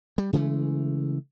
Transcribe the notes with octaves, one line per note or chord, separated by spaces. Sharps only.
G3
C#3 E3 G#3 A3